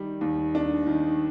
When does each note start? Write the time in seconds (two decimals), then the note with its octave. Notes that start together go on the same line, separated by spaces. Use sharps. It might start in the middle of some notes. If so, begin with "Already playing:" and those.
Already playing: D#3 G3
0.21 D#2
0.55 D4
0.87 D#3